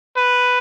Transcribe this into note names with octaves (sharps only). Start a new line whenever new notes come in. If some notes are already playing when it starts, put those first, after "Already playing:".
B4